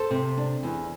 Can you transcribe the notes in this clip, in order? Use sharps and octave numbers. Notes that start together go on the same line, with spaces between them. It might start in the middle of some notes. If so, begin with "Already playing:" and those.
Already playing: A4 C5
C3
D4
E2